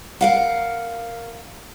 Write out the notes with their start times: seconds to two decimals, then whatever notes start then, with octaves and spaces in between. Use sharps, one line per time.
0.21 A#4 F5 F#5